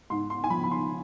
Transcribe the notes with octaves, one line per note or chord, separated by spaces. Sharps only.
G#2 C6
C6
G#5
F3 B5
B5
C6